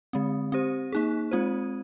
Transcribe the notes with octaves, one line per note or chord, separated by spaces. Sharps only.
D3 G#3 C4
C4 G4 C5
A#3 D#4 G#4
G#3 C4 F4 C5